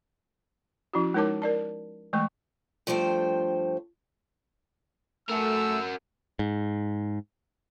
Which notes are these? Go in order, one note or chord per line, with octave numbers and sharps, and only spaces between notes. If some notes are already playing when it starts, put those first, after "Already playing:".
F3 C#4 E4 F#4
G#3 D#4 A#4 C#5 A5 D6
A#4 D5 A5
E3 G#3 A3 C#6
G2 F3 A3 C5 G5
A3 F#4 A#4 E6
G#2